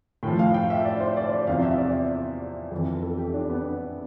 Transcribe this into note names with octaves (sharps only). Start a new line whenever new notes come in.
A2 F3 G5
F5
G5
E5
D5
C5
D5
D5
E2 C3 F3 F5
E5
D5
F2 E3
A4
G4
D4
B3